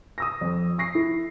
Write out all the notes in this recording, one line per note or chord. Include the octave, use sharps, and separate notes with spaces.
D#6 E6 A#6
F2
C#6 A#6 C7
E4